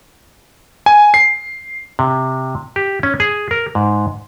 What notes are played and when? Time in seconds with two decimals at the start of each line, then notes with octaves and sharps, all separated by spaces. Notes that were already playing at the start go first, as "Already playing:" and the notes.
0.86 G#5
1.14 C7
1.99 C3
2.76 G4
3.03 C#4
3.20 G#4
3.51 A#4
3.75 G#2